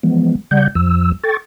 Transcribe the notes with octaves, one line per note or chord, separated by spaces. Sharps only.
E3 F3 G#3 B3
C#3 G3 D5 F#5 G6
F2 F3 E6
A4 G5 C#6 A6